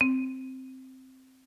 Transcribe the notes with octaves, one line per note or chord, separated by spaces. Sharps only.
C4